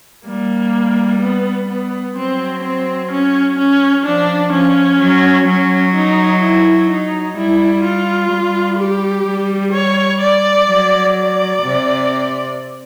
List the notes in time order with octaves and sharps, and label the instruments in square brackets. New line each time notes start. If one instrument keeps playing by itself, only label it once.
[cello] G3 [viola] A#3
[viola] B3
B3
[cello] F#3 [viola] C4
[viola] C4
C#4
C#4
[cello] F3 [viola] D4
[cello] F3 [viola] C#4
[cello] F#3
[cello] F#3 [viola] C#4
[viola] D#4
E4
D#4
[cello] G3 [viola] E4
[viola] F4
[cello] G3
[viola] G4
[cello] G3
[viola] C#5
D5
[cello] F#3
[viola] D5
[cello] C3